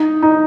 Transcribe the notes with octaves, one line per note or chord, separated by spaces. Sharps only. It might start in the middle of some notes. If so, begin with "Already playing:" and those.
Already playing: D#4
D#4